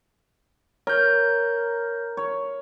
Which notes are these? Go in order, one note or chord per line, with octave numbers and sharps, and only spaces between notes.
A#4 C#5 G6
C#5